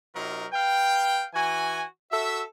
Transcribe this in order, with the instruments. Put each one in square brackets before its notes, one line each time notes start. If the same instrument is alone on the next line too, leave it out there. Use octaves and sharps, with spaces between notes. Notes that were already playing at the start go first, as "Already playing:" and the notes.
[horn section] C3 F#3 D#4 F4 A#4
B4 F5 G5
E3 F#4 G#5
F#4 A4 E5